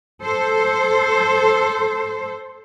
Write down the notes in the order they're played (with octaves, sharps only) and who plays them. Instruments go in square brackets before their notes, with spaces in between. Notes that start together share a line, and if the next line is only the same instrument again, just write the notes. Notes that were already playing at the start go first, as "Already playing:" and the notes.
[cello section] A4 C5